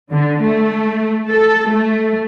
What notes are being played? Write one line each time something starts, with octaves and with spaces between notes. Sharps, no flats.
D3
A3
A4
A3